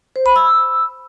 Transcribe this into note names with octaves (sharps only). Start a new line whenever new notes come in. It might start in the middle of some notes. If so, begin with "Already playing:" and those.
C5
B5
E6